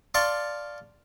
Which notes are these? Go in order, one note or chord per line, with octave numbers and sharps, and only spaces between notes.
D5 F5 A5 C6 C#6